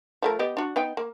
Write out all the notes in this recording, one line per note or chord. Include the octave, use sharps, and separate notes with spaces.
F3 A3 A#4
B3 G4 D#5
D4 F#4
B3 D#4 G5
A#3